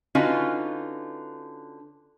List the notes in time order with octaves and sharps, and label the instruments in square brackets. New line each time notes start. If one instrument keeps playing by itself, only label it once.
[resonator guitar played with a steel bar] D3 C#4 D#4 F4 F#4 B4